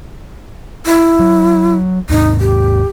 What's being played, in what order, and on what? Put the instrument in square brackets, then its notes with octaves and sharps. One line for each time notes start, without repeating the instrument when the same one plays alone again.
[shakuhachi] E4
[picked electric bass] F#3
[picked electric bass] D#2 G#2 [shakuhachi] D#4
[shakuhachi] G4